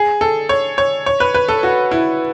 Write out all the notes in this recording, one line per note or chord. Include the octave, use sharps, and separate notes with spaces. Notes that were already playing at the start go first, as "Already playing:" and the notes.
Already playing: G#4
A4
C#5
C#5
C#5
B4
B4
A4
F#4
E4